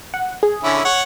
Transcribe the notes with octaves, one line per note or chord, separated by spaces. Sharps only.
F#5
G#4
D3 C#4 E4
C#5 F#5